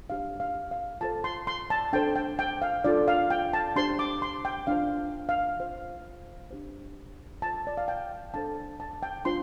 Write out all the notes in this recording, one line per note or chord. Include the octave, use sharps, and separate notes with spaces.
D4 G4 C5 F5
F5
F5
F4 A4 C5 A5
C6
C6
A5
D4 A4 C5 G5
G5
G5
F5
D4 F4 A4 D5
F5
G5
A5
D4 G4 C5 C6
D6
C6
G5
D4 F4 C5 F5
F5
F4 C5
D4 G4 C5
F4 C5 A5
D5
F5
G5
D4 A4 C5 A5
A5
G5
D4 F4 C5 C6